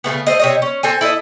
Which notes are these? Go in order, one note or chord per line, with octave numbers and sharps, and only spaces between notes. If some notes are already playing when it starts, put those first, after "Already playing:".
C#3 F3 A3 B3
A3 C5 D#5
C3 C#5 D#5
C#4
C4 A4 G#5
E4 A4 C#5 D#5